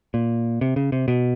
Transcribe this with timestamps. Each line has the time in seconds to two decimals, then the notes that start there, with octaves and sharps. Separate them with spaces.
0.14 A#2
0.61 C3
0.76 C#3
0.92 C3
1.08 B2